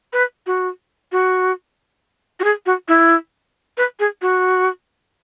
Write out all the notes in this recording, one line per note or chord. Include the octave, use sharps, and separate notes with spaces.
B4
F#4
F#4
F#4
G#4
F#4
E4
B4
G#4
F#4